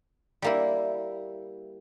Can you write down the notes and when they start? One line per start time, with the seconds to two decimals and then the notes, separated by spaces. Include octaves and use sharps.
0.42 G3 A#3 E4